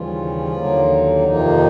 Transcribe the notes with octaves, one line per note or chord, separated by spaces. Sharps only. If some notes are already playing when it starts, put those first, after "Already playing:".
Already playing: D#2 C#3 E3 F3 G3 F4
D#2 D3 F#3 A#3
F2 C3 D#3 F3 A#3 D#4